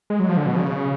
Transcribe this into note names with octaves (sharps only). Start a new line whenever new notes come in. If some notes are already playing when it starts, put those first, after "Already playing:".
G#3
F#3
F3
D3
B2
C#3